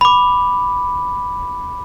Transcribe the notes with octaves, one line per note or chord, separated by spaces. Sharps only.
B5 D6